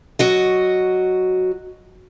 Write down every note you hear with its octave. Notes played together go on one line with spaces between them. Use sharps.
F#3 F#4 D#5